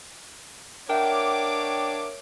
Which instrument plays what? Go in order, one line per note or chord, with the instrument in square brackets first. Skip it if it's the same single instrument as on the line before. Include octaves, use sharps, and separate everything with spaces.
[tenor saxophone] D4 [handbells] A#4 E5 F#5 [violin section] C#5 D6 [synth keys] G5